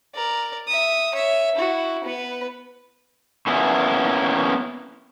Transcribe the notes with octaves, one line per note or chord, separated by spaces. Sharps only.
A#4 D5
E5 D#6
C#5 E5
E4 F#4
B3 B4
A#3 B3 C#4 E4